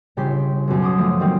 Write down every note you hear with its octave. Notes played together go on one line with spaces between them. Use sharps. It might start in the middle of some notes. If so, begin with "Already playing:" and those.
G1 C#3 G4 C6 B6
B1 F#2
C6 D6 D#6
F3 A3
D#3 F#3 G3 A#3 C4